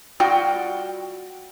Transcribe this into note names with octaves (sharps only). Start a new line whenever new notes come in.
G3 F4 F#4 G5